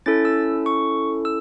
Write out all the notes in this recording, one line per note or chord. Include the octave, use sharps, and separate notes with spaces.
C#4 E4 A4 A6
E6
C#6
E6